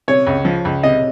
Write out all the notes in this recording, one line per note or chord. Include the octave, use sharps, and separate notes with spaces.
C3 C#5
C#2
F3
C#2
C3 D#5